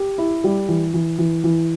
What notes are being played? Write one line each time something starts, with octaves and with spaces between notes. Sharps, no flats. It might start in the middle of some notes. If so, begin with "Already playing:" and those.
Already playing: G4
E4
G3
E3
E3
E3
E3